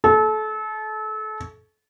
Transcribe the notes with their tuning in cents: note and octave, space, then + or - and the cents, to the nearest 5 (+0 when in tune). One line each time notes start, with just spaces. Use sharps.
A4 -30